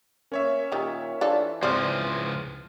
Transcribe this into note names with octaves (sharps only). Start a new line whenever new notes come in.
A#3 C#4 C#5 E5
A#2 D#3 G4
E3 D4 F4 A4
C#2 F3 C4 C5 D5 C6 F6